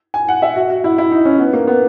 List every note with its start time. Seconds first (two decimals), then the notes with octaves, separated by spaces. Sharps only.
0.14 G#5
0.29 F#5
0.42 E5
0.56 F#4
0.70 F#4
0.84 E4
0.98 E4
1.11 D#4
1.25 C#4
1.39 B3
1.53 A#3
1.67 B3